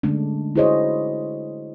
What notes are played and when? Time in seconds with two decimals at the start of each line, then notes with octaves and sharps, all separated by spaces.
0.03 D3 G#3 A3 C#4 D4
0.56 E4 F#4 G#4 C5 C#5 D#5